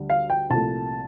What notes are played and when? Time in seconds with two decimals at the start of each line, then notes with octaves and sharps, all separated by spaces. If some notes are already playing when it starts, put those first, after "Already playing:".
Already playing: D2 D3 G3
0.10 F5
0.30 G5
0.50 C2 A#2 F3 A3 A5